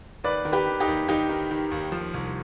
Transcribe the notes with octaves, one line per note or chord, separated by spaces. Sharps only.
D#2 B4 D5
D#3
G4 B4
D#3
D#4 G4
D#2
D#2 D#4 G4
D#3
D#3
D#2
F3
C2